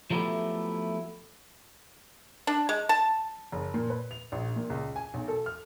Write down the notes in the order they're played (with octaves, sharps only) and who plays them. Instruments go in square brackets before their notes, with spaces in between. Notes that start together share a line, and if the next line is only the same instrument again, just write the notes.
[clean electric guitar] F3 F#3 A3 B3 E4 G4
[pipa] D4
G#3
A5
[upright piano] F#1
A#2
B4
F7
A#1
A#2
C#2
G#5
B1
A4
F6